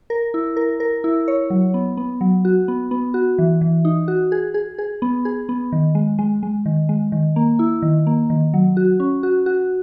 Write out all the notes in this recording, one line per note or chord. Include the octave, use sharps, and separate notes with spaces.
A#4
E4
A#4
A#4
E4
C#5
F#3
B3
B3
F#3
F#4
B3
B3
F#4
E3
E3
D#4
F#4
G#4
G#4
G#4
B3
G#4
B3
D#3
G#3
G#3
G#3
D#3
G#3
D#3
A#3
E4
D#3
A#3
D#3
F#3
F#4
C#4
F#4
F#4